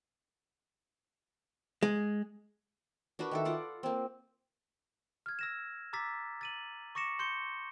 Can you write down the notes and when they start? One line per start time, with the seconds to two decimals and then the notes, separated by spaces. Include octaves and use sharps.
1.83 G#3
3.19 D4 F#4 A#4 B4
3.31 D#3 E4 A4
3.45 F4 D5 F#5
3.83 A#3 C4
5.26 F6 G#6
5.39 E6 A#6 E7
5.93 A#5 D6 E6 A6 B6
6.41 A6 D#7 F#7
6.95 C#6 D6 A#6 C#7 E7
7.19 C6 G6 C#7 G7